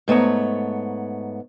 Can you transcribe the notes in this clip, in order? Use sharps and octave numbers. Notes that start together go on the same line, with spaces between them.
G#2 A3 B3 C#5 A#5